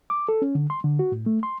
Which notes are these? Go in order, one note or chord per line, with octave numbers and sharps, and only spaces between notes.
D6
A4
C#4
D3
C6
D3
F#4
A2
A3
C6